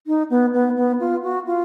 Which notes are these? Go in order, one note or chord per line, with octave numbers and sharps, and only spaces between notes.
D#4
B3
B3
B3
F4
F#4
F4